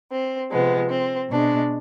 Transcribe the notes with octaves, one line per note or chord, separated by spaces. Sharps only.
C4
C3 F3 G#3 B3
C4
B2 G#3 D4